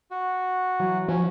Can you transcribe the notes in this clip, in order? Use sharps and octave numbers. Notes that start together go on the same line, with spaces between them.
F#4
E3 F#3
F3 C#4